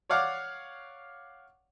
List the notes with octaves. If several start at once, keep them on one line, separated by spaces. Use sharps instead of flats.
C#5 D5 F5 F#5 D6